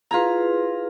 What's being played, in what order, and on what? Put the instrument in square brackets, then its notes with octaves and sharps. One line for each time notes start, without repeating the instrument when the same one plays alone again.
[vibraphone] E4 G#4 B4 [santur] F4 A#5